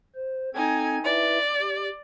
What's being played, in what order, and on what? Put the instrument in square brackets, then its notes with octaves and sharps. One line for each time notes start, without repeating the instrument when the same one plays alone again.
[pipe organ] C5
[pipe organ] C4 A4 G#6 [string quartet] D#4 G5 G#5
[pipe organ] E4 B4 E5 [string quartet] D5
[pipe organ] G4